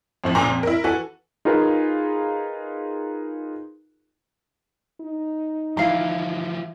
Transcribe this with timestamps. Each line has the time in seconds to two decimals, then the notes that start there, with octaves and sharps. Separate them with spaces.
0.24 F2 A2 F3
0.35 C#2 A#2 A#5
0.48 F2
0.63 E4 A#4
0.84 E3 F#4 A4 G#5
1.45 D#4 F4 G#4 A#4 B4 F5
5.01 D#4
5.77 E3 F3 E4 F5 A#5